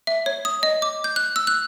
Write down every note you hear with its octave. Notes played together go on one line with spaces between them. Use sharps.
E5
C#5
D#6
D#5
D6
G6
F#6
E6
F#6